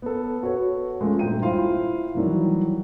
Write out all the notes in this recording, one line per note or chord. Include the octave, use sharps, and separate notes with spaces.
B3 A4
F#4 A4 B4 C#5
G#3 A3 C#4 F4
D#1 G2 A3 G5 A#5 D#7
E4 F4 C5 F5 C6
D#3 E3 F#3 G3